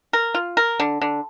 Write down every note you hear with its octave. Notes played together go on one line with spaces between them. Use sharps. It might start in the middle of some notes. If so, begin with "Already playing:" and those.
A#4
F4
A#4
D3
D3